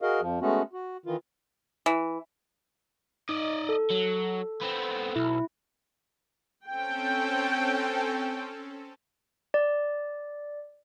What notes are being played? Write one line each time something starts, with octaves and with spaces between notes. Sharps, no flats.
F#4 G#4 A#4 D#5 F5
F2 F3
G#3 A3 B3 C#4 F#4
F#4
D#3 E3 F4
E3
D#4 D5 D#5
A4
F#3
B3 C4
B1 E4
C4 C#4 A4 G5
D5